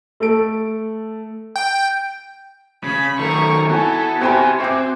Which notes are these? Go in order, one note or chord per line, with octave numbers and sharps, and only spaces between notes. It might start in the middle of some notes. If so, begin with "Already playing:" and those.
A3 A4 D7
G5
C#3 B5
F#2 D#3 A3 A#4 C#6
B3 E4 F#4 A4 G#5
C4 F#4 G4 G5 G#5 B5 C6
C4 C5 E5 D6